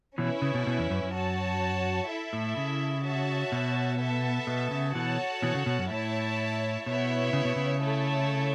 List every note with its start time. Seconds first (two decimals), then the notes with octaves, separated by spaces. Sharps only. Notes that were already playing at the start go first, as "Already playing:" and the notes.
0.18 B2 E3 C#4 E4 B4
0.42 C#3
0.54 B2
0.67 B2
0.79 E2
0.90 F#2
1.02 F#2
1.14 F#4 C#5 A5
2.09 E4 A4 E5
2.33 A2
2.57 C#3
3.05 F#4 C#5 E5 A5
3.52 B2
4.00 B3 A4 E5 A5
4.47 B2
4.71 C#3
4.95 B2 E3 F#4 A4 C#5 F#5 A5
5.42 B2 E3
5.55 C#3
5.66 B2
5.79 F#2
5.90 A2 E4 C#5 E5 A5
6.86 B2 B3 E4 C#5 E5
7.33 C#3
7.45 B2
7.56 C#3
7.82 A3 E4 A4 C#5 E5